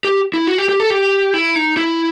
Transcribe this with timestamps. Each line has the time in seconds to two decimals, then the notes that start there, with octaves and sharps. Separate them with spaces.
0.04 G4
0.34 E4
0.47 F#4
0.58 G4
0.69 G4
0.80 A4
0.90 G4
1.34 E4
1.56 D#4
1.77 E4